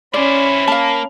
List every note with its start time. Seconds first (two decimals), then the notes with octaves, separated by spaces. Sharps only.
0.14 C#4 E4 C5 D5 B5
0.68 A#3 F5 A5